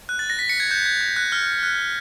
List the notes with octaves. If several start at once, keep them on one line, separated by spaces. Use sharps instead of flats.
F#6
A6
A#6
B6
C#7
G#6
G6
G#6
G6
F#6
F6
F#6